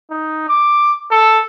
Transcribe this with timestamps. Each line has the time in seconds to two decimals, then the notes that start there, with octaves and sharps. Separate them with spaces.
0.11 D#4
0.48 D6
1.11 A4